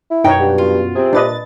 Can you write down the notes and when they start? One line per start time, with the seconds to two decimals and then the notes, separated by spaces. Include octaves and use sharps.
0.10 E4
0.24 F#2 B2 D#4 F#4 C#5 G5
0.40 G2
0.58 F4
0.95 C3 C4 G#4
1.13 A#2 D4 B4 D#5 A6